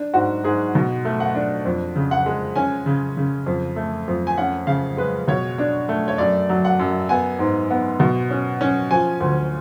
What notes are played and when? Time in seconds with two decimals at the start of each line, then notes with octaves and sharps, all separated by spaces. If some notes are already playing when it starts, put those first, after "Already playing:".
Already playing: D4
0.14 G#2 F#4
0.44 G#2 G#4
0.75 B2
1.05 A3
1.20 F#5
1.35 D4
1.65 F2
1.96 C#3
2.11 F#5
2.26 G#3
2.56 C#4 G#5
2.86 C#3
3.17 C#3
3.46 F2
3.76 A3
4.08 F2
4.27 G#5
4.38 C#4 F#5
4.67 C#3 F5
4.97 G#3 B4
5.28 B2 C#5
5.58 D4
5.89 A3
6.08 C#5
6.18 F#2 D5
6.50 F#3
6.65 F#5
6.79 F#2
7.09 B3 G#5
7.39 G#2
7.70 B3
8.00 B2
8.31 C#4
8.61 C#4
8.91 F3 G#5
9.20 D2